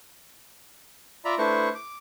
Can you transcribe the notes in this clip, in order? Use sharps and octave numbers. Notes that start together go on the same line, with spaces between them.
F4 D5 E5 A#5 B5
A3 D4 E4 B4 C5 C#6
D6